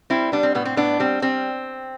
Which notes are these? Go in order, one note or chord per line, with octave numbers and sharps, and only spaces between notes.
G3 C4 E4
G3 B3 D4
C4
A2 B3
C4
A2 B3 D4
G3 C4
G3 C4